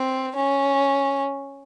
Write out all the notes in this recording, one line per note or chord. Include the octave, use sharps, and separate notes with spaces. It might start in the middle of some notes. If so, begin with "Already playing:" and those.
Already playing: C4
C#4